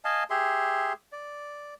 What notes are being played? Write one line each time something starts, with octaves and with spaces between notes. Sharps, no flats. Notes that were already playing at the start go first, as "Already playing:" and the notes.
D#5 F5 G#5 A5
G4 G#4 E5 C6
D5